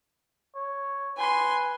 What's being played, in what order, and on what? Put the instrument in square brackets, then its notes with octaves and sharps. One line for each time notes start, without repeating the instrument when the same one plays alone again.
[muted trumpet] C#5
[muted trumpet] B4 [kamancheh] G#5 C6